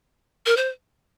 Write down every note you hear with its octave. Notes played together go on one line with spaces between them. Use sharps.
A#4
C5